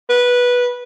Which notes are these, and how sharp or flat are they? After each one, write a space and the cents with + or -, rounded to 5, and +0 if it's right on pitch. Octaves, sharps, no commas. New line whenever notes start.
B4 -10